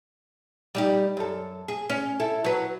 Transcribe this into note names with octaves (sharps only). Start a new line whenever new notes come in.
G3 D#4 G4
F#2 A4
G#4
C#4
E4 A4
F#3 B4